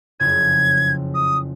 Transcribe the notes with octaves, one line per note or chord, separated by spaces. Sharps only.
F#1 F2 C#3 G#6
D#6